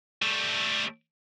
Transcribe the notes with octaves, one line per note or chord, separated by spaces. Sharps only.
G3 A3